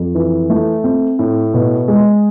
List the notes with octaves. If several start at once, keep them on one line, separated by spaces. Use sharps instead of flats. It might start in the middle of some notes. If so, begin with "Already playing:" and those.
Already playing: F2
E3
A3
C4
A2
B2
G#3